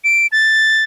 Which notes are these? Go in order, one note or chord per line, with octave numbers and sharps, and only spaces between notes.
D7
A6